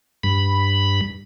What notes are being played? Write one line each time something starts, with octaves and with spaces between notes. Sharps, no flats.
G2 B5